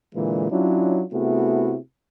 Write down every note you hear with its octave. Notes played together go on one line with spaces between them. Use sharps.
A#2 D3 E3 G#3
F#3 C#4 D4 E4 F4
C3 A3 B3 E4 F#4 G#4